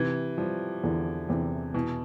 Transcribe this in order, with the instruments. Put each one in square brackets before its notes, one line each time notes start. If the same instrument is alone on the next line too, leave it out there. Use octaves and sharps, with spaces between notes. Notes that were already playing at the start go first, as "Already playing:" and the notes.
Already playing: [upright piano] C3 [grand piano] E3
[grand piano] F3 [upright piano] G3
[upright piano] E2 [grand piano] D3
[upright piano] E2 [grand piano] C3
[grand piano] B2 [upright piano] E3